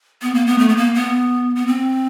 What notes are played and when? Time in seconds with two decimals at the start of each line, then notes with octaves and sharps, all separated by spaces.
0.22 B3
0.34 A#3
0.46 B3
0.59 A3
0.68 B3
0.77 A#3
0.94 B3
1.56 B3
1.67 C4